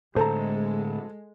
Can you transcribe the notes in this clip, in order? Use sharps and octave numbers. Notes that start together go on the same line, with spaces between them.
A2 D3 G#3 A4 C5 A5 A#5